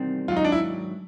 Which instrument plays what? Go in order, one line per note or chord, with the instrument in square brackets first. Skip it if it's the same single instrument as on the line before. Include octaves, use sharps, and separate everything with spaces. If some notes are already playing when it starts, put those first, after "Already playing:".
Already playing: [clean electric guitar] E2 C3 D#3 G3 C4
[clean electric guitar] G#2 D#3 F#3 [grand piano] F4
[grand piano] D#4
D4
E4